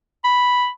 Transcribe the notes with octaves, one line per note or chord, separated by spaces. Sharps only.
B5